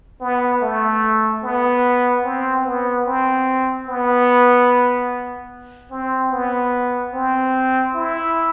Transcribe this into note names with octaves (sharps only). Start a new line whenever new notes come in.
B3
A3
B3
C4
B3
C4
B3
C4
B3
C4
E4